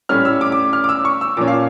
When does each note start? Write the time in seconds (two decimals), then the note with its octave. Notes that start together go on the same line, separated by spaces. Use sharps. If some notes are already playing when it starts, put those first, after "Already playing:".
0.09 A2 G3 C#4 F6
0.25 E6
0.41 D6
0.52 D6
0.73 F6
0.84 D6
0.89 E6
1.05 C#6
1.21 E6
1.37 A#2 F3 C#4 D6
1.48 F5